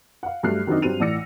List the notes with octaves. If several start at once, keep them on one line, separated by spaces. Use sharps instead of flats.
F5 F#5
G2 F#3 A3 F6 F#6 C7
D#3 F#3 C4 D4 D#4
G2 F#3 C4 D#7 F7
A1 A2 D5 E6 A#6 C#7